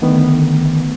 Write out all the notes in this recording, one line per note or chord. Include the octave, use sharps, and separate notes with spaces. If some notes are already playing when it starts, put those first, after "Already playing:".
D3 D#3 A3 B3